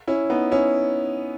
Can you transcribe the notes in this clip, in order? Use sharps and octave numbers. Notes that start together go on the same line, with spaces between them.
C#4 E4
B3 D#4
C#4 E4